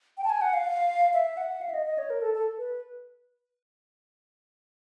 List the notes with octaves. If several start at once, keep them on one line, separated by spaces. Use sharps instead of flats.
G5
A5
G#5
F#5
F5
E5
F#5
F5
E5
D#5
D#5
C#5
A#4
A4
A4
B4